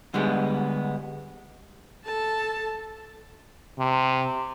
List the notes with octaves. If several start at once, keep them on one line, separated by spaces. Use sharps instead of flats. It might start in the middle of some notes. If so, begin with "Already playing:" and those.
D3 G3 G#3 B3
A4 A5
C3